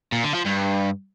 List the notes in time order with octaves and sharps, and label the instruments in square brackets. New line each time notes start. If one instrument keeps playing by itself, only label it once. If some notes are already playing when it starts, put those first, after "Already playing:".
[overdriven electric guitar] A#2
D3
F3
G2